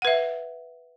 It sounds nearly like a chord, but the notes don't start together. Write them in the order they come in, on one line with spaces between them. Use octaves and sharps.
F#5 B4 E5